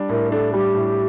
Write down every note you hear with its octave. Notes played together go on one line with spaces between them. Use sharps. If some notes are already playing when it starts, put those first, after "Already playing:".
Already playing: G3 D4
A2 A#4
D4 A4
G3 G4
A2